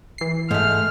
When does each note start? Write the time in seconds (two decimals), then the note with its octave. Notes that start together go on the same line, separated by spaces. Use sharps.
0.18 E3 C7
0.51 G#2 A3 F6